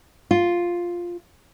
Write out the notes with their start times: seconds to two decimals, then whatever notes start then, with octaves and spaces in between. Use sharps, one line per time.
0.31 F4